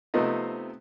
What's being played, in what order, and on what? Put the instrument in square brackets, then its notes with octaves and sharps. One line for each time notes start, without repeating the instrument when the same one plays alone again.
[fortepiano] C3 F3 A3 B3 C4 D#4